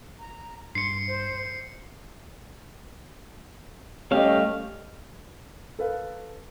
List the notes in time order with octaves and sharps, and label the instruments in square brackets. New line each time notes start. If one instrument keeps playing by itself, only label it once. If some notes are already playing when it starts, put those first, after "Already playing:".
[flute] A#5
[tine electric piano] G2 [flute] C6 [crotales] C7 C#7
[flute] C5
[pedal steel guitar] G3 A3 F5 [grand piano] C#4 G4 D#5
[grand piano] A4 B4 F5